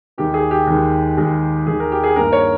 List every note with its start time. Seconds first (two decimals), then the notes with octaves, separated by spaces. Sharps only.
0.18 D#2 D#3 G#3 G4
0.34 G#4
0.51 G4
0.67 D#2 D#3 G#3
1.17 D#2 D#3 G#3
1.66 D#2 D#3 G#3 G#4
1.80 A#4
1.92 G4
2.04 G#4
2.16 G2 D#3 G3 A#3 A#4
2.32 C#5